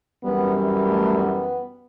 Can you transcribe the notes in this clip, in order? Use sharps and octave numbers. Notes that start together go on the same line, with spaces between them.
F#2 E3 G3 B3
A3
B3